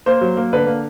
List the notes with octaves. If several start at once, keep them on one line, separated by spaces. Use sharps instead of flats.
A#3 C5
F#3
A#3
D3 B4
A#3